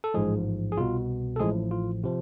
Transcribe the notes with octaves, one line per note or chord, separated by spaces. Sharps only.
A4
A1 G#2 F3 G#3 G#4
G#4
C2 B2 F4
A4
A1 A2 F3 G#3 G#4
F4
C3 F3